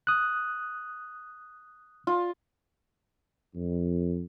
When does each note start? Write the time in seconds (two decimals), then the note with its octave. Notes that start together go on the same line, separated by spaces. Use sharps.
0.07 D#6 F#6
2.07 F4
3.54 F2